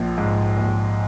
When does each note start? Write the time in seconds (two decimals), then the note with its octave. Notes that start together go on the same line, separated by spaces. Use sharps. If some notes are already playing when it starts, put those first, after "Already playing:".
Already playing: A#1 F3
0.18 G#2
0.57 A#1